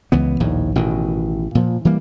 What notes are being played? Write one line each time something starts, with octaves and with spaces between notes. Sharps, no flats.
C#2 E3 B3
A#1 D#2 A2
A1 B2 D#3
A#2 F3
E3 G3 A#3